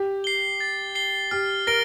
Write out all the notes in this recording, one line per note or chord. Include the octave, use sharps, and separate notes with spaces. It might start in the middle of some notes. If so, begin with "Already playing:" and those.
Already playing: G4
C7 G7
A6
C7 G7
G4 F6
A#4 A#6 D7 G7